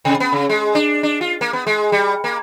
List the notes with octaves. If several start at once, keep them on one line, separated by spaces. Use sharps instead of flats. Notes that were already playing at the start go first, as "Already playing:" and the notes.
C3
B3
C#3
G#3
D4
D4
F4
A#3
B3
G#3
G3
A#3